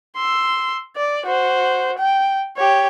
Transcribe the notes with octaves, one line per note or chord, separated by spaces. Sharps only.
C6 E6
D5
F#4 C5
G5
G4 C#5